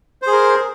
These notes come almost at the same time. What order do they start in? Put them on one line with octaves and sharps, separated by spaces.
C5 G#4 A#4